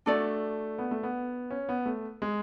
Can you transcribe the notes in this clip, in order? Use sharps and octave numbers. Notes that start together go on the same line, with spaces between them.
A3 D4 F#4 A4 D5
B3
A3
B3
C#4
B3
A3
G#3